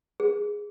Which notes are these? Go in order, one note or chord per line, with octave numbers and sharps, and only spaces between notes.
G#4